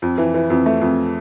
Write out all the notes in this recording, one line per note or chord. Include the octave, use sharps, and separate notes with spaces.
F2
E3
E3
F2
A3
F2